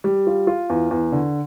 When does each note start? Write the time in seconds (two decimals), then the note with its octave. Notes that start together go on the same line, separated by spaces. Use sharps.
0.04 G3
0.27 F4
0.47 F4
0.70 E2
0.91 E2
1.12 D3